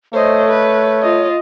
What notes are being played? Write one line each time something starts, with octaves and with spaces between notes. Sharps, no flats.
A3 C5 C#5 D#5
B4
F4 D#5